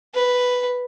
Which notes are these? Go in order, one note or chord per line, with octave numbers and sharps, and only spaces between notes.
B4